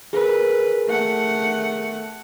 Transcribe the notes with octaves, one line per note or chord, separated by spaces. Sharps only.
G#4 A#4 B4
A3 F#5